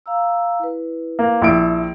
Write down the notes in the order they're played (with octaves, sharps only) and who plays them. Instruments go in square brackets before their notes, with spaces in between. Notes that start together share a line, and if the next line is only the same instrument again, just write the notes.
[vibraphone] F5 A#5 E6
E4 B4
[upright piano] A#3
A#1 E4 D7